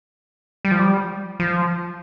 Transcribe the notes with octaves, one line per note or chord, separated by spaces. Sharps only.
G3
F3
G3
F3